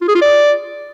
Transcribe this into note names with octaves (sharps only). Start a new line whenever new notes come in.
F4
G#4
F4
D5